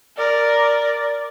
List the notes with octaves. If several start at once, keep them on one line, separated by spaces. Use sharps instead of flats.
A#4 D5